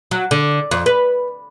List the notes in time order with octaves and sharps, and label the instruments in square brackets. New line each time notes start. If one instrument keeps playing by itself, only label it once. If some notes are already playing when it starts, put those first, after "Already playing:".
[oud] F#3
D3
F2
B4